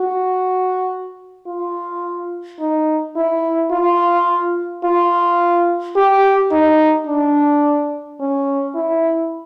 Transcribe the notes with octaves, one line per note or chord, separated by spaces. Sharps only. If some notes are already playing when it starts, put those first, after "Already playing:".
Already playing: F#4
F4
D#4
E4
F4
F4
G4
D#4
D4
C#4
E4